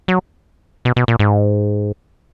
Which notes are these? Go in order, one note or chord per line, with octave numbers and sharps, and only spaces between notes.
F#3
B2
B2
A#2
G#2